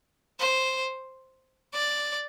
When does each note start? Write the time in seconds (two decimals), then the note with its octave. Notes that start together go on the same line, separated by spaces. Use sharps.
0.39 C5
1.74 D5